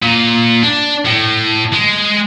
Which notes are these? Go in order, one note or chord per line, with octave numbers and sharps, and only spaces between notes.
A#2
D4
A2
G#3